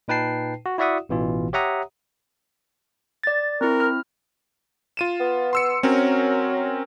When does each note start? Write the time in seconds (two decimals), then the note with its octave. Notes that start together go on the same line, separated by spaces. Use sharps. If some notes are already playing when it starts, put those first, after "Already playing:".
0.08 A#2 D#4 B4 G5 A5 C7
0.66 F#4
0.78 E4 F#4 D5 E5 F#5 D#6
1.09 A1 B2 E3 F4
1.53 G4 C#5 E5 F#5 A#5 D#6
3.24 D5 A6
3.61 C4 E4 A#4
3.80 F6
4.97 F4 D#7 E7
5.20 B3
5.53 C6 E6 C#7
5.83 F#3 C4 C#4 A#4